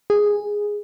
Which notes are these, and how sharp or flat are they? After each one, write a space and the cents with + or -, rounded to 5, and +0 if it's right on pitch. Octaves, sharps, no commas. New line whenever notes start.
G#4 -10